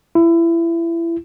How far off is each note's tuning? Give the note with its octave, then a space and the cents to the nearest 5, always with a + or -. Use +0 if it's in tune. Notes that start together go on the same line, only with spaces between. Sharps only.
E4 +25